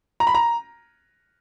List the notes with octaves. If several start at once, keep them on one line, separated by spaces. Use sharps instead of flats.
A#5
B5
A#5